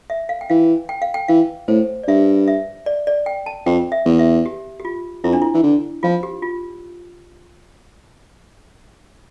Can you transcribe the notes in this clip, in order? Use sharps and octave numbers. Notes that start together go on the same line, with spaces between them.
E5
F5
G5
E3 F5
G5
F5
G5
E3 F5
A2 C5
D5
G2 E5
E5
D5
D5
G5
A5
F2 G5
E5
E2
E5
G4
G4
F4
F2 E4
D4
E4
E3
D3
F3 F4
G4
F4